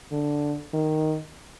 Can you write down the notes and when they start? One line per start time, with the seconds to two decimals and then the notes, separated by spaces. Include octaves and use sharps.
0.12 D3
0.74 D#3